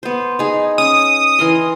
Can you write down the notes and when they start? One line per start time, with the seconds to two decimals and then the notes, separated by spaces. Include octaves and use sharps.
0.03 B3 C5
0.39 D#4 G#4
0.78 C#4 D#6
1.39 E3 A#4 C6